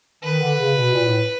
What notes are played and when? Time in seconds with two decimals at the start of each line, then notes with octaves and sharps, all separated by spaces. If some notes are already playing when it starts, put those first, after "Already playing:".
0.23 D#3 B4
0.40 D3
0.58 C#3
0.76 B2
0.93 A#2
1.05 A2